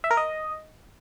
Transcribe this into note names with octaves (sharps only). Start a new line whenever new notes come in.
E5
A#4
D#5